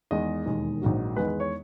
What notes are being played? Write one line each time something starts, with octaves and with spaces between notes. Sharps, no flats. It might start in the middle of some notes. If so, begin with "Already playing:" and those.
E2 D#3 G#3 D#5
E1 D#2 D#3 G#3
A#1 G#2 D#3 F#3
E2 D#3 G#3 B4
B4
C#5